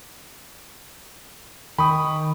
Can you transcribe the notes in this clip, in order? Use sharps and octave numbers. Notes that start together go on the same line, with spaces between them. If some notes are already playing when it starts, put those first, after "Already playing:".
D#3 G5 B5 C#6 D#6